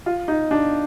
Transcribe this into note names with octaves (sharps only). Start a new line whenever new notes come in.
F4
D#4
D4